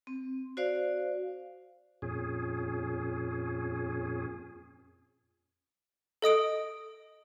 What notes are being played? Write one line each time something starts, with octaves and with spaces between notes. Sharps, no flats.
C4
F#4 C5 D5 F5
F2 A#2 C#4 G#4
A4 D#5 D#6 D7